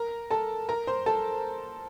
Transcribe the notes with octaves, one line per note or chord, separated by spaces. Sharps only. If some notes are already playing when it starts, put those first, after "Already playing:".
Already playing: A#4 A#5
A4 A5
A#4 A#5
C5 C6
A4 A5